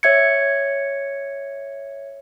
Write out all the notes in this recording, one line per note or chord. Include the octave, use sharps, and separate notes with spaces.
C#5 E5 G#6 C#7